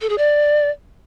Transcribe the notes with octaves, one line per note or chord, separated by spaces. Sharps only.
A4
G#4
D5